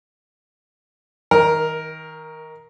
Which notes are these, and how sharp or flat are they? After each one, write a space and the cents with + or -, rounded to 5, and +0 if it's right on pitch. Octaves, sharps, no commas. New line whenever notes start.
D#3 +30 A#4 +5